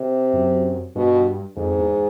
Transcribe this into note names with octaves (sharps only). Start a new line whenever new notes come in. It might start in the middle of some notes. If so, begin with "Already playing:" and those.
Already playing: C3
F#2
G2 B2
F2 G#2
E2